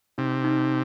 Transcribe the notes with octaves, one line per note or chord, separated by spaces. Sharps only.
C3 D#4
D#4